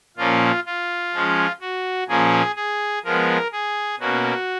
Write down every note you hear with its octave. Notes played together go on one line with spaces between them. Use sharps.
A#2 F3 A#3 C#4 F4
F4
F3 G#3 C#4
F#4
A#2 F3 A#3 C#4 G#4
G#4
F3 G#3 B3 A#4
G#4
B2 A#3 C#4 F#4